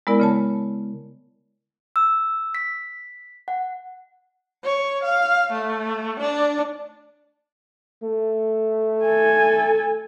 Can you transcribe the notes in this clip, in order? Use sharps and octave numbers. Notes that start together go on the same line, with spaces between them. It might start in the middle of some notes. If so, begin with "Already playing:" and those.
G#3 B3 E4 A#4 D5
C#3 C#5 A5
E6
B6
F#5
C#5
F5
A3
D4
A3
A4 G#5